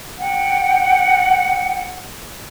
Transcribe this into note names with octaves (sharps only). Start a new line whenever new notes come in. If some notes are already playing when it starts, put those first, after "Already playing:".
F#5 G5